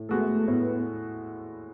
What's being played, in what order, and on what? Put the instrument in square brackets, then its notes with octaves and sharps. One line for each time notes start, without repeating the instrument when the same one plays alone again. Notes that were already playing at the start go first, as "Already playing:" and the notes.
Already playing: [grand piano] A2
[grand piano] G#3 B3 F#4 A4 [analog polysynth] A3
[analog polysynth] A3
[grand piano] A2 [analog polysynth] B3